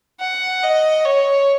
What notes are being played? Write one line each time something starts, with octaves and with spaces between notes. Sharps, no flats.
F#5
D#5
C#5